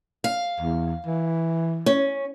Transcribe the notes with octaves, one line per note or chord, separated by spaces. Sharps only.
F5
E2
E3
C#4